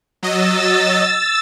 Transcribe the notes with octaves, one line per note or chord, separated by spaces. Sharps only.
F#3 D#5 E6 A6